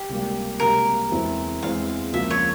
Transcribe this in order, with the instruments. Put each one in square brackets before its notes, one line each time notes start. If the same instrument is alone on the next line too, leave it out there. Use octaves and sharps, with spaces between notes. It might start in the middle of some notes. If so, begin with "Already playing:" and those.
Already playing: [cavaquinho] G4
[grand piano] C#2 C3 G3 A#3
[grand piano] C#2 C3 G3 A#3 [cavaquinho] A#4
[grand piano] E2 E3 G#3 C4 E4
[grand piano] E2 E3 G#3 C4 E4 [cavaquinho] F5
[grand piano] C#2 C#3 F3 A#3 F4 [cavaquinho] E5
[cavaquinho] C#5